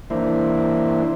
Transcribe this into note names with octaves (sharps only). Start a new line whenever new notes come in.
E3 A#3 D4 E4 C5